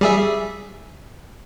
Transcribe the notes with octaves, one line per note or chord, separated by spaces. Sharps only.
G3 G#4 E5